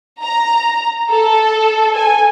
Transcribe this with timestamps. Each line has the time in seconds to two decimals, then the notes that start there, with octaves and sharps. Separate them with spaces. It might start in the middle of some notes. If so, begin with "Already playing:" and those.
0.22 A#5
1.10 A4
1.96 G#5